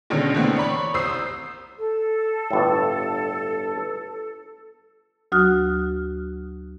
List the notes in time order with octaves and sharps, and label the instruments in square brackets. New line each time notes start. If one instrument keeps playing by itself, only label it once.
[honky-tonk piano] B2 D3 D#3 G#3 C#4
D3 E3 A3 B3 C4
C#5 D5 B5 C#6
C2 C5 D#6 E6 C7
[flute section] A4
[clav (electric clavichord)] G1 A2
[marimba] D2 F#3 F#4 D#6 F6 F#6